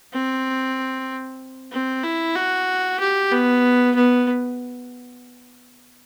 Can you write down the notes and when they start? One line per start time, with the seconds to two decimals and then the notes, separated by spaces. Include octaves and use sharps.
0.13 C4
1.72 C4
2.03 E4
2.36 F#4
2.99 G4
3.31 B3
3.95 B3